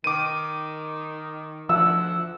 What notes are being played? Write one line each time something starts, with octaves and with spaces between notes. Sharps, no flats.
D#3 D6 D#7
D2 F3 F#5 E6